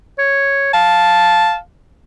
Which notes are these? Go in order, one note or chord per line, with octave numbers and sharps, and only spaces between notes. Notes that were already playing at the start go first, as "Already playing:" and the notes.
C#5
F5 A5